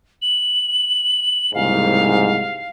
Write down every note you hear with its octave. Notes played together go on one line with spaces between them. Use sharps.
F#7
F#1 C2 G#2 F5